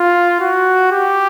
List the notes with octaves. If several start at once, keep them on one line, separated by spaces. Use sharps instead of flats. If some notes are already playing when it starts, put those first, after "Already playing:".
Already playing: F4
F#4
G4